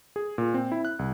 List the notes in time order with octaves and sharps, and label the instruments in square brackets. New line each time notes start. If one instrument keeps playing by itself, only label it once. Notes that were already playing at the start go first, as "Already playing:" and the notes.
[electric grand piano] G#4
A#2
C4
E4
F#6
C2